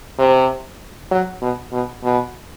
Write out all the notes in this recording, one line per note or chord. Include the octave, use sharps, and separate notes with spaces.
C3
F#3
B2
B2
B2